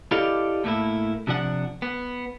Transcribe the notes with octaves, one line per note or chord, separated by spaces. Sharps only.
E4 G4 A4 D5 D#5 F5
A2 A3 A#3 E4
C3 F3 D4 F#5
B3